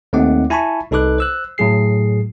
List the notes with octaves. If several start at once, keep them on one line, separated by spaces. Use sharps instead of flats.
D#2 A3 C4 D#4 F#5 D6
E4 G#5 A5 B5 C#6
C2 D#4 A4 B4 D6 F#6
C5 E6 F#6
A2 F#3 G#4 C7